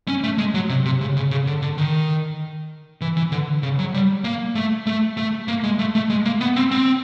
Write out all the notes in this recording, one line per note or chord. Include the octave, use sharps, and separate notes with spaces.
C#4
A3
G#3
F#3
C3
C3
C#3
C#3
C#3
D3
D3
D#3
E3
E3
D3
C#3
F#3
G3
A#3
A3
A3
A3
A#3
G#3
A3
A3
G#3
A#3
B3
C4
C4